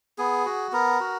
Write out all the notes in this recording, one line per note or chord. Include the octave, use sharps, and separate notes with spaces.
B3 G#4
F#4
B3 A#4
F#4